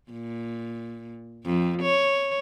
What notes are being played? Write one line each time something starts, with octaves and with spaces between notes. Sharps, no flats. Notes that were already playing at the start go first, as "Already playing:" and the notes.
A#2
F2
C#5